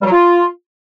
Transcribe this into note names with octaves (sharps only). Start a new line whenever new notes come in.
G3
F#3
F4